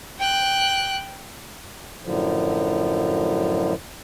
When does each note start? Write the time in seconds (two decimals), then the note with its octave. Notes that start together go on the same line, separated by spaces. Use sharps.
0.19 G5 F#6
2.02 F#2 A2 D3 F3 F#3